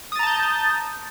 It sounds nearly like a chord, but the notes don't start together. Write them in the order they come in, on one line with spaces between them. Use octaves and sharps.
D#6 A6 A#5 A5 G6